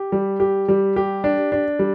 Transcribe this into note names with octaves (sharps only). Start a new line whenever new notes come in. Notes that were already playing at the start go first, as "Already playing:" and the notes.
Already playing: G4
G3
G4
G3
G4
D4
D4
G3